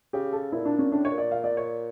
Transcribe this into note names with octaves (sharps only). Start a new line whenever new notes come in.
C#3 G4
A4
A#2 E4
D4
C#4
A2 D4
C#5
A#2
D5
F5
D5
C#5